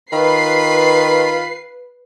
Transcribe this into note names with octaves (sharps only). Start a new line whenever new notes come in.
D#3 F4 B4 B5 C7